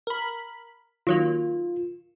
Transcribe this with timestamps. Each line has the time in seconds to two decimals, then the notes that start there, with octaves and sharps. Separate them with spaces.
0.07 A#4 B5
1.07 D#3 F#3 A#3 F4